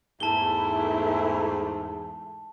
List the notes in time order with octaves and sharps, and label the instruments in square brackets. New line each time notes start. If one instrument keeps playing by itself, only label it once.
[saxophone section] E2 G#2 [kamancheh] A3 E4 [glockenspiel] A5 G7